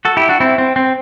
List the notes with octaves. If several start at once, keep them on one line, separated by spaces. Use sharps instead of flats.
F#4 A4
E4 G4
D4 F#4
C4 E4
C4
C4